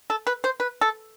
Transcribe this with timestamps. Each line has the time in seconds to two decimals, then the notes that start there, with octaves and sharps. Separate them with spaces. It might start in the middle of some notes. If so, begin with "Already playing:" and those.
0.10 A4
0.27 B4
0.44 C5
0.60 B4
0.81 A4